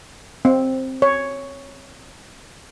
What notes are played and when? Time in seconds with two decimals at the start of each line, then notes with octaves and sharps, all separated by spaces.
0.45 C4
1.02 C#5